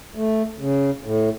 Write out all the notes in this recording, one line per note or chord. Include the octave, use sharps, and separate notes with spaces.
A3
C#3
A2